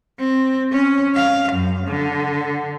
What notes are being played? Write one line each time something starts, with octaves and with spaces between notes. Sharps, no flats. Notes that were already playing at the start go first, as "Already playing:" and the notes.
C4
C#4
F5
F#2
D3